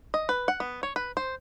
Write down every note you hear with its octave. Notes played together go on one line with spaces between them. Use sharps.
D#5
B4
F#5
B3
C#5
B4
C5